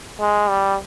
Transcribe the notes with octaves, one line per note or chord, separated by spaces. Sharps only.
G#3
G3